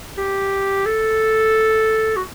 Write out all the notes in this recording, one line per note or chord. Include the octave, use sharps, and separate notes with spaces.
G4
A4
F#4